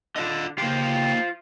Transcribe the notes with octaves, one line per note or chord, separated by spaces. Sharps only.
D3 F4 D#5
C#3 A#3 F4 G4 C5 G5